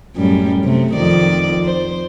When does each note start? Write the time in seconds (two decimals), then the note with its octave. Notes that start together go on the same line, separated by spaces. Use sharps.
0.16 F#2 A2 G3
0.65 C3 A3
0.94 F2 D#3 D5
1.63 C5